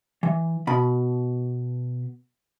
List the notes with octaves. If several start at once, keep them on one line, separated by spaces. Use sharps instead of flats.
E3
B2 B5